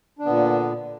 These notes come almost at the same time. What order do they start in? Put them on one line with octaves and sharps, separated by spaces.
D4 D3 B3 A#2